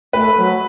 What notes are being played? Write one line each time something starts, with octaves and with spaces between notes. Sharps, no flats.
A3 B4
F#3